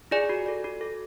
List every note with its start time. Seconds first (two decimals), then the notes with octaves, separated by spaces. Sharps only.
0.11 F4 G#4 D5 G#5
0.29 F#4
0.46 A4 D5
0.64 F#4
0.81 A4 D5